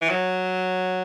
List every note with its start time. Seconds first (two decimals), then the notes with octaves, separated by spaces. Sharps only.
0.01 E3
0.10 F#3